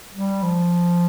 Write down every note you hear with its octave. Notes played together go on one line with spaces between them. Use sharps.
G3
F3